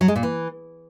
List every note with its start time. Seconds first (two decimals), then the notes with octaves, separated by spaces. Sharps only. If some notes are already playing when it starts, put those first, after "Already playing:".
0.01 F#3
0.08 G#3
0.16 A#2
0.23 E3